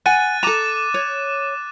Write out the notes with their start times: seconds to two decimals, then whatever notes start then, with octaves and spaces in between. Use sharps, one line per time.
0.06 F#5 G#5 F#6 A6 D#7
0.43 A4 A#5 D6 D#7 E7
0.94 C#5